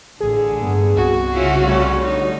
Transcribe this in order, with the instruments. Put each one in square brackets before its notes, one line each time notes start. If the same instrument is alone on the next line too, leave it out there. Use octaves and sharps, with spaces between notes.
[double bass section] A1 [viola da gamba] D3 [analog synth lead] G#4
[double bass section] G2 B3
[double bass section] C2 [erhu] F#4
[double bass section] C2 C#3 [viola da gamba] C#4 E4 F4
[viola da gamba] G3 A3 C#4 [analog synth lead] C#5
[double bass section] D3 F#3 [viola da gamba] D#4